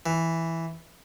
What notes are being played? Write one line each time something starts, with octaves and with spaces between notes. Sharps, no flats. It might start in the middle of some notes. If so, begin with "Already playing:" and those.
E3